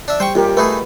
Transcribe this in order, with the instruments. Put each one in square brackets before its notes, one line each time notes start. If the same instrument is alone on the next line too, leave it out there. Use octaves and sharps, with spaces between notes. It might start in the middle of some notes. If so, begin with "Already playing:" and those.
[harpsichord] D4 E5
[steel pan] G3 [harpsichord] C5 G5 C#6
[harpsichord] D#2 [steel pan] F4 G4 A#4
[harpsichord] A3 D#4 G#4 [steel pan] B4